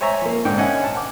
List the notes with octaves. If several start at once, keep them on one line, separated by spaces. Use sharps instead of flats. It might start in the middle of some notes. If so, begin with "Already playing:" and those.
C5 C#5 E5 G#5 A#5 C#6
F3 A#3
G#2 D3 G5
C#4 D#5 E5 F#5 G#5
F#5 A5
F#5 D6